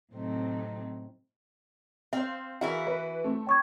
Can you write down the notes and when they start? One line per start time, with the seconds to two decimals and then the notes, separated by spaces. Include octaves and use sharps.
0.12 A2 C3 F#3 A3 C4 D#4
2.13 C4 C5 F5
2.61 E3 E4 F#4 G#4 A#4 F5
2.87 B4
3.24 A3 C4
3.47 C#5 G5 C#6 D6 G#6